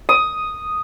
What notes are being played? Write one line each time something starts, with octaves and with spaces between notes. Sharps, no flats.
D#6